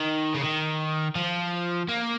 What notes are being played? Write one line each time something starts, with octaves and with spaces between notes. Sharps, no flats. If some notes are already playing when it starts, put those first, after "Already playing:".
Already playing: D#3
C#3
D#3
F3
A#3